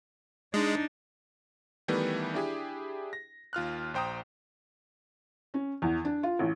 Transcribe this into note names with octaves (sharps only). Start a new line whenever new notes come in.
G#3 D4 D#4
D#3 E3 G3 A3 B3
D4 E4 G4 G#4
A#6
D#2 F4 F6 F#6
A#1 C5 G5 A#5 D#6
C#4
E2
D4
F4
A1